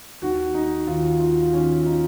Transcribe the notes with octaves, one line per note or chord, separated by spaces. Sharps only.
D#2 D#3 F#4
D#4
D#2 D#3 F4
F4
D#2 D#3 C#4
F4
D#4